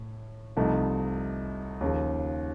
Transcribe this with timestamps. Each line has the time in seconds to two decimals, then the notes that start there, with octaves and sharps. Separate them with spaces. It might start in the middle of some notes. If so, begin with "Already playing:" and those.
Already playing: A2
0.56 C2 C3 F3 A3 D#4
1.81 D#2 C#3 F3